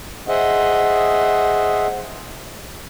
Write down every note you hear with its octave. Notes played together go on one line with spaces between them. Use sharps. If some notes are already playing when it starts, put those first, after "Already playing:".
G#4 C5 D#5 E5 F#5